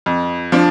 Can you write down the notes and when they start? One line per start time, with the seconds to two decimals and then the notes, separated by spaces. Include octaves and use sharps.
0.06 F2
0.52 F3 D4